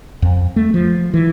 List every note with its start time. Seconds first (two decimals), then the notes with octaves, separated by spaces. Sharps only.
0.22 F2
0.56 A3
0.74 F3
1.14 E3